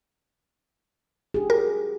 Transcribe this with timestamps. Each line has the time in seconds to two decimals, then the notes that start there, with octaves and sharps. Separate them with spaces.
1.34 D4 G4 G#4
1.50 F#4 A#4